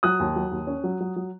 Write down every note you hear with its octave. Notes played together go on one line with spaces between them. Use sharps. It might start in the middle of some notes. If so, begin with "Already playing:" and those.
F#3 D#6 F#6
D#2
F#3
D#2
C#4
F#3
F#3
F#3